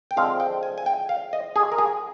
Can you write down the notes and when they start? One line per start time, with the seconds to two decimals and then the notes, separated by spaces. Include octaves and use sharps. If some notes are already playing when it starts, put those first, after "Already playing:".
0.11 G5
0.16 D3 F3 G#3 C4 F5
0.40 G5
0.63 G#5
0.78 G#5
0.86 G5
1.09 F5
1.33 D#5
1.56 G#4
1.72 A#4
1.78 G#4